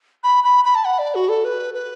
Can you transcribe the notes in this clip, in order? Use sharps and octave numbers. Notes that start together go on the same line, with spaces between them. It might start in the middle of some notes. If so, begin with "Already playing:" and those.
B5
B5
B5
A5
F#5
D5
F#4
A4
B4
B4